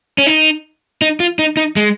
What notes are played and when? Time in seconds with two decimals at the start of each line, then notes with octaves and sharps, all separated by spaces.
0.18 C#4
0.26 D#4
1.02 D#4
1.20 F4
1.39 D#4
1.57 D#4
1.76 G#3